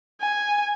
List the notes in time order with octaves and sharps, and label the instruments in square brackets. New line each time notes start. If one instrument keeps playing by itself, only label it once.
[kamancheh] G#5